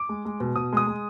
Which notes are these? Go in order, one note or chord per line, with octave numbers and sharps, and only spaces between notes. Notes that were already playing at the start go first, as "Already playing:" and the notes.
Already playing: D6
G#3
G#3
B2
B2 D#6
G#3 D#6
G#3